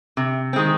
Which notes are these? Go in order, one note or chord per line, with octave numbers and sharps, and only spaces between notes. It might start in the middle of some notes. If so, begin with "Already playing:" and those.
C3
D#3 G#3 C4